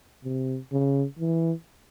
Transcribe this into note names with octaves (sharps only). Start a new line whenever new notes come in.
C3
C#3
E3